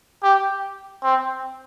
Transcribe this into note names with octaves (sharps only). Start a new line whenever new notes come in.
G4
C4